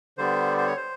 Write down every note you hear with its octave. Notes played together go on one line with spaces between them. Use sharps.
D3 G3 B3 C5
C5
C#5
C5